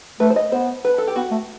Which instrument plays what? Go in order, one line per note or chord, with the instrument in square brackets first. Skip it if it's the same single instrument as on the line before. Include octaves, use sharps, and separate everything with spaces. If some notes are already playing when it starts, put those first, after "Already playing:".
[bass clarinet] A3 [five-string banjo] B4
[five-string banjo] C5
D#5
[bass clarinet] B3 [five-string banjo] C5
[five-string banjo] B4
A4
G4
[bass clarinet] B3 [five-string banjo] F#4
[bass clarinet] A3